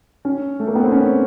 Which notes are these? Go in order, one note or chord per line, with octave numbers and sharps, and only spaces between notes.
C#4
A3
A#3
B3
C4
C#4